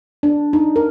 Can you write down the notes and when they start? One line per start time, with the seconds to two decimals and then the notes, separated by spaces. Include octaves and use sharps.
0.23 D4
0.53 D#4
0.76 A#4